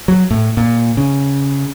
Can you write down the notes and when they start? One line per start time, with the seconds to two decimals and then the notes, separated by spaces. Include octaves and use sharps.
0.08 F#3
0.31 A2
0.57 A#2
0.97 C#3